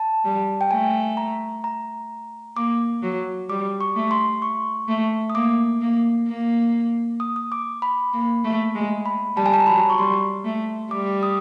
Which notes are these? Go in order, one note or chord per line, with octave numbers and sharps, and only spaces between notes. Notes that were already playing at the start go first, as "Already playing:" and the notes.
Already playing: A5
G3
G5
A3 G#5
A#5
A#5
A#3 D6
F#3
G3 D6
C#6
A3
C6
C#6
A3
D#6
A#3 D6
A#3
A#3
D#6
D#6
D6
B5
A#3
A3
G#3
B5
G3 A5
G#5
A5
A#5
F#3 B5
C#6
G3 C6
A3
G3 D6
D#6